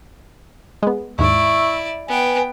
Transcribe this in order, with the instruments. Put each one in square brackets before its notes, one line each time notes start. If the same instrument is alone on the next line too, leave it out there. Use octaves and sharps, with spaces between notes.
[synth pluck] G#3 B3
[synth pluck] D#2 G#2 [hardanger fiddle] E4 D5 [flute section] C#6 E6
[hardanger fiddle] B3 G5 [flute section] B4 G#5